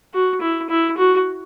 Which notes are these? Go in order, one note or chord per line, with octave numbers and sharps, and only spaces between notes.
F#4
E4
E4
F#4